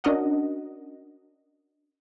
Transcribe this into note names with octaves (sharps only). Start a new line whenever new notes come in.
C#4 D4 F#4 A#4 D#5 F#5